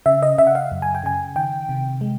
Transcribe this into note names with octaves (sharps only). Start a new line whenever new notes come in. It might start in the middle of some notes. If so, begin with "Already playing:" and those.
C#3 E5
D#5
C#3 E5
F#5
F5
F#2
G#5
G5
C#3 G#5
D#3 G5
C3
G#3